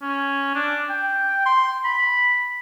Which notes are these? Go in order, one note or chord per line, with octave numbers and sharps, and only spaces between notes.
C#4
D4
G5
C6
B5